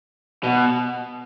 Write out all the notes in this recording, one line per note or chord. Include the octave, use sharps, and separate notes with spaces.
B2